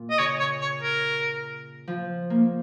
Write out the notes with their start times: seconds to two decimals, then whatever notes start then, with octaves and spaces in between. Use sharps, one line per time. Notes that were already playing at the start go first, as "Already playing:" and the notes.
Already playing: A#2
0.10 D#5
0.19 C#3 C#5
0.40 C#5
0.61 C#5
0.83 A#4
1.88 F3
2.30 A#3